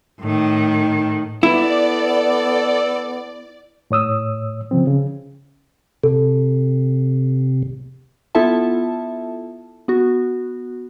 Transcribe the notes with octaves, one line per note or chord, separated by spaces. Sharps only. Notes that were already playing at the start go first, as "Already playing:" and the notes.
A2 D#3
B3 E4 A4 D5
A2 C#5 D#6 E6
C#3 F3 C4
C#3
C3 A4
B3 E4 F4 A4 E5 A5
B3 F#4